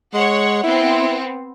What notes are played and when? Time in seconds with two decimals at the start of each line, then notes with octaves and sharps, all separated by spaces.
0.14 G#3 C#5 F#5
0.64 B3 C4 E4